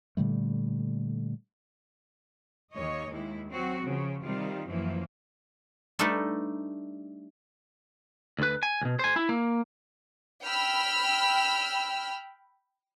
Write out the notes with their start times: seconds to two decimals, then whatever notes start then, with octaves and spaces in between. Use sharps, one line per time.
0.17 A#2 D3 G3 A3
2.71 D#2 C#5 D#5
3.10 D#2 G#3 E4
3.48 F#3 C4 F#4
3.82 C#3 F3
4.22 C3 D#3 G3 F4
4.65 F#2 E3 F3 A#3
5.99 G3 A3 D4 D#4 A4 B4
8.39 D2 B4
8.63 G#5
8.81 C#2 B2
8.99 C5 G#5
9.16 E4
9.29 A#3
10.43 G5 B5 E6 F6